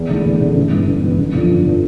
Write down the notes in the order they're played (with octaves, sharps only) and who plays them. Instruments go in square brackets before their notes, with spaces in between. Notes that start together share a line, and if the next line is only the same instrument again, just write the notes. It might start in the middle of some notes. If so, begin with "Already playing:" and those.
Already playing: [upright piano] E2
D3 A3 E4
E2
D3 A3 E4
G1
G2 E3 B3
G1
G2 E3 B3
G1
F2 D3 F3 B3
G1
D3 F3 B3